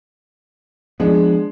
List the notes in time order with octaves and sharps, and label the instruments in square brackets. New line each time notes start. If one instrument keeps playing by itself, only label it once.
[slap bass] F3 B3 [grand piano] G#3 D4